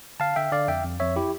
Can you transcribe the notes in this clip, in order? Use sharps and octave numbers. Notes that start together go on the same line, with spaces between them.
D3 F5 A5
D3 E5 G5
D3 D5 F5
F2 E5 G5
F2
F2 C#5 E5
E4 G4